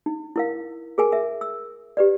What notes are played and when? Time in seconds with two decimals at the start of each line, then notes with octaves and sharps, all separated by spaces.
0.06 D#4
0.36 E4 A#4 F5
0.98 G#4 A#4 G#5
1.12 A#4 E5
1.41 E6
1.97 G4 B4 D5